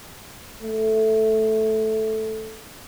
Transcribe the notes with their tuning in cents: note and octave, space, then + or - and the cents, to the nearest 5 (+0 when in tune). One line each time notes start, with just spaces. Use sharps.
A3 -5